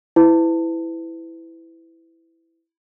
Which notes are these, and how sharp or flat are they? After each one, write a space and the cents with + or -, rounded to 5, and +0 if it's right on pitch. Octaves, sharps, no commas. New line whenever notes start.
E4 +0 B4 +35